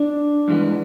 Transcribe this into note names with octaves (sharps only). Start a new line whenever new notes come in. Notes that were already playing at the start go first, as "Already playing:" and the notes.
Already playing: D4
G2 E3 G#3 B3